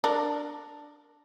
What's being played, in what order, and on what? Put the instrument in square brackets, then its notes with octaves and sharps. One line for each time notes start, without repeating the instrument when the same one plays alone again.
[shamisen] D4 A#4